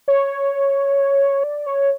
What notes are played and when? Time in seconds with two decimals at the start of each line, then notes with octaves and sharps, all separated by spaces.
0.08 C#5
1.43 D5
1.66 C#5